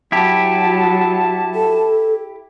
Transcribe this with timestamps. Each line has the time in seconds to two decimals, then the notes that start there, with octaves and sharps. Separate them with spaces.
0.12 F#3 E4 G4 A5
1.55 A4